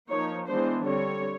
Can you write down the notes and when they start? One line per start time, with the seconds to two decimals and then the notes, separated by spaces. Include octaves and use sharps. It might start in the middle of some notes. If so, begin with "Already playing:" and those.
0.10 F3 A#3 D#4 C#5
0.47 E3 G#3 B3 D4 C5
0.85 D3 G3 C4 C#5